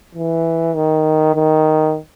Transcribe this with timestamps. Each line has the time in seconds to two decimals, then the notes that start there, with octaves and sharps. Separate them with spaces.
0.15 E3
0.76 D#3
1.35 D#3